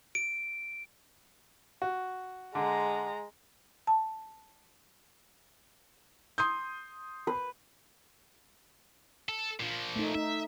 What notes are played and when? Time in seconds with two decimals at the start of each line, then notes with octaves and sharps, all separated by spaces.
0.15 D7
1.82 F#4
2.55 D3 G#3 A#5
3.87 A5
6.38 C6 D#6 G6
7.27 B4
9.29 A4
9.60 A#2 F3
9.96 A3 D#4
10.15 D#4 E5